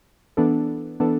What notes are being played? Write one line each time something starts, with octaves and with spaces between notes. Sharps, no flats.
E3 B3 D4 A4
E3 B3 D4 A4